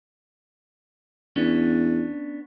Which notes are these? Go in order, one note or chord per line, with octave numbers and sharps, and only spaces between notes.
E2 B3 C#4 D4